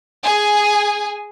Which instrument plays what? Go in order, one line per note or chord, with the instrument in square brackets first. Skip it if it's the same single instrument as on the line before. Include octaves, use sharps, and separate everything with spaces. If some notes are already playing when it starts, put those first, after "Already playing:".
[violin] G#4 G#5